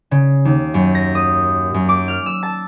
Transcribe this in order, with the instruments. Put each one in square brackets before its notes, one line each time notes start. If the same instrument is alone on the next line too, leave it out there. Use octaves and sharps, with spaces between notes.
[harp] C#3
D#2
F#2
A#6
D#6
F#2
D6
F6
E6
A5